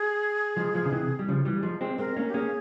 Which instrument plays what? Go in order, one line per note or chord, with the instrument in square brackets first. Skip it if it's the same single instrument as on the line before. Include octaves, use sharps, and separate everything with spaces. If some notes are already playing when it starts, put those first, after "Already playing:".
Already playing: [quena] G#4
[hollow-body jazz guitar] F3 G#3
F3 G#3
C#3
C3 E3
G3
C#3 F3
E3 G3
F3 G#3
G#3 C4
[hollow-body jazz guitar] G#3 C4 [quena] A#4
[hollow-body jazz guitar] A#3 C#4
[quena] G4
[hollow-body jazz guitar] A#3 C#4 [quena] G#4